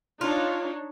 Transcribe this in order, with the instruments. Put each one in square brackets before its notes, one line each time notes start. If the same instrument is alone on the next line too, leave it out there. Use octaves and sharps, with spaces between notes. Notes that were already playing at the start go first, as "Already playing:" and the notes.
[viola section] D4 D#4 C#5 [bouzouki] F4